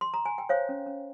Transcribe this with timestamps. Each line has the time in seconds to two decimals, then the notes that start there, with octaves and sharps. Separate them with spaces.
0.01 C6
0.14 A#5
0.26 G#5
0.38 G5
0.49 C5 C#5 F5
0.69 C#4
0.87 C#4